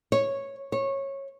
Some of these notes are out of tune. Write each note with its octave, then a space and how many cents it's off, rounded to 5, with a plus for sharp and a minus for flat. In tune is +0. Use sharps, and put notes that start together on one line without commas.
C#5 -10
C#5 -20